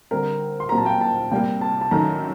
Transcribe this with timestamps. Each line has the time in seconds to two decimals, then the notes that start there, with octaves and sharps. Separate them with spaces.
0.11 D3 G3 C4 A#4
0.60 C6
0.69 A#2 F#3 C4 G4 A#5
0.78 A5
0.86 G5
1.01 A5
1.31 C3 G3 A#3 G5
1.61 A5
1.81 A5
1.91 F#2 D#3 A3 A#5